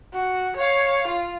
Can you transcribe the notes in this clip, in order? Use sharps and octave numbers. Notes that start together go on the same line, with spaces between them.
F#4
C#5 F5
F4